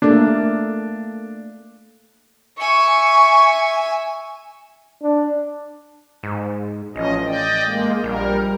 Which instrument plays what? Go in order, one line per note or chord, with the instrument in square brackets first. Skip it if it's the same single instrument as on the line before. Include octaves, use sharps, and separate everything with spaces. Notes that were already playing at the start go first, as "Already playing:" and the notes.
[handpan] A3 A#3 A4 [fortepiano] D4
[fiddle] E5 G#5 [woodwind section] C#6
[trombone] D4
[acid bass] G#2
[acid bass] A1 [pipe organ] F3 C#4 D#5
[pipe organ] D5 D#5 G5
G#3 A#3
[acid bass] A#1 [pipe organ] G3 A#4